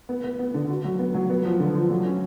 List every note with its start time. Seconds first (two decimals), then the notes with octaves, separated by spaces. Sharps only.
0.09 B3
0.24 B3
0.39 B3
0.54 D3
0.70 F#4
0.84 F#3
0.99 B3
1.14 F#3
1.30 B3
1.45 F3
1.60 D3
1.75 F3
1.90 F#3
2.05 C#4